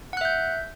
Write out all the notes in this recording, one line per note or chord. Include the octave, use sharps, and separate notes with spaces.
E5 F#5 F#6 G6